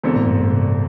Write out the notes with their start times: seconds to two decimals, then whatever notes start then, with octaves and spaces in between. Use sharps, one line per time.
0.03 E1 E2 D3 C4 A4
0.16 A2
0.27 G2
0.39 A2
0.51 G2 C3